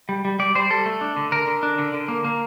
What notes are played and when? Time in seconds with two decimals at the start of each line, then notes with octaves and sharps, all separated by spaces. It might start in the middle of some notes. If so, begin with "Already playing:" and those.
0.09 G3
0.25 G3
0.39 G3 D5
0.55 G3 C5
0.70 G3 A4
0.86 A3
1.01 D4
1.17 D3
1.32 D3 A#4
1.47 D3
1.63 D4
1.78 D3
1.94 D3
2.08 A#3
2.24 A#3